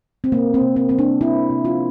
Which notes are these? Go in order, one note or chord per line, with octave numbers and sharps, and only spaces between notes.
C4
C3 A#3
C4
C3
C4
G3 C4
D4
A#3 E4
C3
F4